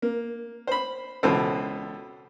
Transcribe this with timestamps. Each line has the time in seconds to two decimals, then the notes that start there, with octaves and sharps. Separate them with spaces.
0.02 A#3
0.67 C5 B5
1.23 C#2 B2 E3 A4 C5